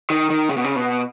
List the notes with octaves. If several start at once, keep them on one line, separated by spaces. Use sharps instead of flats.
D#3
D#3
C#3
B2
C#3
B2